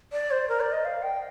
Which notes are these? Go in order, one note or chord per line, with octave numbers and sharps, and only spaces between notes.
D5
C5
A#4
D5
D#5
F5
G5